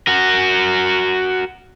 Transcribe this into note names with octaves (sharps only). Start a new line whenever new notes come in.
F#4 A#4